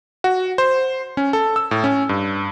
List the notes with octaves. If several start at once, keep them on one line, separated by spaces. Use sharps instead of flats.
F#4
C5
C#4
A4
E6
A2
C#4
G2